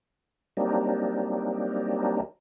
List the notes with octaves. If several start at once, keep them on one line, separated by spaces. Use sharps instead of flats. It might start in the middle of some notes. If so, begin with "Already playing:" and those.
F#3 G3 A#3 C4 D4 D#4